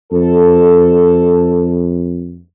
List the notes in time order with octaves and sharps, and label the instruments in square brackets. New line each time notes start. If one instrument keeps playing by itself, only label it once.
[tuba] F2 [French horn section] A4